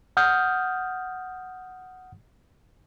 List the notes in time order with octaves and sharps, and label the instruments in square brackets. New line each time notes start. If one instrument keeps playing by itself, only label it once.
[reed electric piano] F#5 D#6 F6 G6